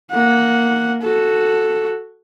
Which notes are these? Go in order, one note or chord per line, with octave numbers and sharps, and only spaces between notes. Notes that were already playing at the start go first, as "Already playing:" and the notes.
A#3 F#5
F#4 A4